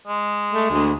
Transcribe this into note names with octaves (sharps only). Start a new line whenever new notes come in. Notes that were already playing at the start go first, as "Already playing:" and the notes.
G#3
A3
D2